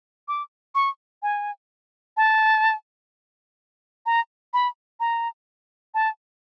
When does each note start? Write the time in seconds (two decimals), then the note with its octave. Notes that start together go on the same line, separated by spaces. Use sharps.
0.28 D6
0.75 C#6
1.23 G#5
2.17 A5
4.06 A#5
4.53 B5
5.00 A#5
5.94 A5